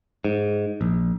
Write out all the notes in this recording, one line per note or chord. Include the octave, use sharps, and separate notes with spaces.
G#2
A#1